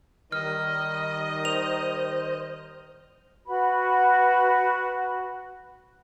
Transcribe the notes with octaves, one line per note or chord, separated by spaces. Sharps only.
D#3 G3 D#5 F6
C5 F7
F#4 B4 B5